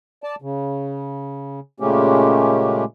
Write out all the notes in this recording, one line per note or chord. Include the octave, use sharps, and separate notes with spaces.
D5 A5
C#3
A#2 C#3 G#3 A3 C#4 G4